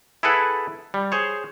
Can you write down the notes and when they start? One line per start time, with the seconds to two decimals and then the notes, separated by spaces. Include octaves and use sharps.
0.23 E4 G#4 A4 B4 F#5
0.94 G3
1.12 G#4 C5 C#5